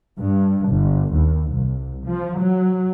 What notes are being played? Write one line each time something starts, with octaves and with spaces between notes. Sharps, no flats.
G2
G1
D#2
C2
F3
F#3